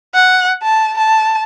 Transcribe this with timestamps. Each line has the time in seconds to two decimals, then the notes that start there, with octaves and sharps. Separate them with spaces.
0.14 F#5
0.63 A5
0.98 A5